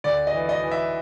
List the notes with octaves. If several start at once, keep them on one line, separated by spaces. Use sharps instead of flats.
D2 D5
D#5
E3
D#5
E3
E5